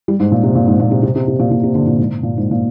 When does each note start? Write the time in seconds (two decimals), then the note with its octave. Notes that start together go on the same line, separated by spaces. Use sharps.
0.08 G3
0.20 G#2
0.32 A#2
0.43 C3
0.55 A#2
0.68 G#2
0.80 A#2
0.91 C3
1.03 C3
1.16 C3
1.28 C3
1.40 A#2
1.51 A#2
1.63 C3
1.75 D3
1.87 A#2
1.99 G#2
2.23 A#2
2.37 G#2
2.51 A#2